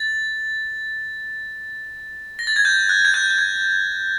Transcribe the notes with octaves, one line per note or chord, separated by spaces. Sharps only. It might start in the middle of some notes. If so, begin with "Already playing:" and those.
Already playing: A6
A#6
A6
G#6
G6
F#6
G#6
G6
G6
G#6